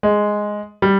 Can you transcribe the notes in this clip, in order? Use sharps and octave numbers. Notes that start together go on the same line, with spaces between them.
G#3
G3